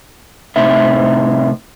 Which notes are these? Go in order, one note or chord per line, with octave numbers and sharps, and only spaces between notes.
A2 C3 C4 D#4 E5